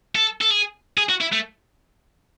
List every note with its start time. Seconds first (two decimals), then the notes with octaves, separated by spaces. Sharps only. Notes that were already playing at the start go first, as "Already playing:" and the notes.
0.15 A4
0.41 A4
0.50 G#4
0.98 G#4
1.09 F#4
1.21 E4
1.33 A3